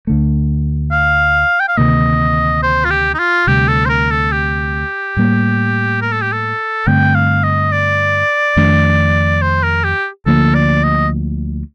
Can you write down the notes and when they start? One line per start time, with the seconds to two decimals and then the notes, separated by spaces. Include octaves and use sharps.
0.07 D2 D3 A3
0.92 F5
1.60 G5
1.68 F5
1.77 D2 C3 D#3 A#3 D#5
2.62 C5
2.85 F4
2.90 G4
3.14 D#4
3.19 F4
3.47 D2 C3 G3 G4
3.68 A4
3.86 C5
3.89 A#4
4.11 A4
4.32 G4
5.17 A2 G3 A#3
6.02 A#4
6.12 A4
6.22 G4
6.32 A4
6.87 G2 D3 A3 C4 G5
7.15 F5
7.43 D#5
7.72 D5
8.56 F2 D#3 A3 D4
9.42 C5
9.63 A#4
9.84 G4
10.26 D2 D3 F3 A#3 A4
10.54 D5
10.83 D#5